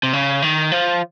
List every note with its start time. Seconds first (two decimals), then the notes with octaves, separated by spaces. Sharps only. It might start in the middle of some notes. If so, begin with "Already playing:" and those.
0.03 C3
0.13 C#3
0.42 D#3
0.72 F3